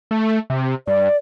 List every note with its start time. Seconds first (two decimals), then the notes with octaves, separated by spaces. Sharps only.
0.11 A3
0.50 C3
0.87 G2 D5